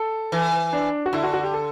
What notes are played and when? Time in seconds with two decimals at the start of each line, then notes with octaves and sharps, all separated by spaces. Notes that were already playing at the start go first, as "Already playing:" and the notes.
Already playing: A4
0.32 E3
0.73 D4
1.06 F#4
1.13 D3 E4
1.23 F#4
1.33 F#4
1.44 G4
1.54 A4